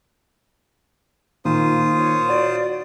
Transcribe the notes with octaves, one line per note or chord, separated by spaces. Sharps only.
A#2 D#3 A#3 F4 C5 D#6
C#5
F#4 C#5 D5